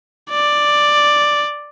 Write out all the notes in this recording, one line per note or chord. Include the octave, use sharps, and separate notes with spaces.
D5